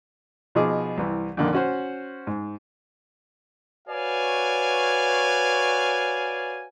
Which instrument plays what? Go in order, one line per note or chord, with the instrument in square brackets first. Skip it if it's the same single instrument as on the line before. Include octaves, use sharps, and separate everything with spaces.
[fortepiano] B2 F3 D#4 G#4 D6
C2 E3
F2 A#2 D3 D#3 A#3
C#4 F#4 C5
G#2
[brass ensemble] F#4 B4 C#5 D5 F5 G#5